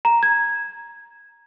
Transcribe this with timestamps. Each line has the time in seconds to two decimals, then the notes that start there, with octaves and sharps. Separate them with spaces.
0.05 A#5
0.23 G#6